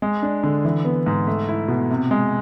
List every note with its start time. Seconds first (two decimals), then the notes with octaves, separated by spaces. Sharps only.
0.02 G#3
0.23 D4
0.43 D3
0.65 E3
0.85 B3
1.06 G#2
1.27 A3
1.49 E4
1.68 B2
1.90 C3
2.11 G#3